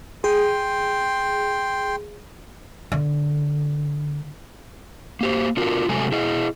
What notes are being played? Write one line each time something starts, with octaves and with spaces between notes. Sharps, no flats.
G#4 G5 C6
D3
A#3 G4 C5
D4 F4 F#4 A#4
C3 F#3 G#3 A3 A4 G#5
E4 G#4 D#5